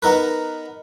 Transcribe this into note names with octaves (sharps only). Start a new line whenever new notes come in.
B3 D#4 A#4 B4